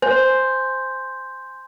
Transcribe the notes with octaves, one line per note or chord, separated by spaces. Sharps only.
C5 G#5 C6 G6